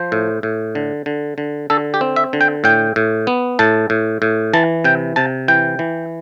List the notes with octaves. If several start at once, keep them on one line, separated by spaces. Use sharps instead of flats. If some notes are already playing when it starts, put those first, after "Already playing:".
Already playing: F3 C5
A2
A2
D3
D3
D3
D3 A4
G4
C4
E5
D3
G5
A2 G5
A2
B3
A2 A5
A2
A2
E3 A5
C3 G5
C3 A5
E3 G5
E3